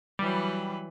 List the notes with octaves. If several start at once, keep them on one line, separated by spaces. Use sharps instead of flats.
E3 F#3 G3 B4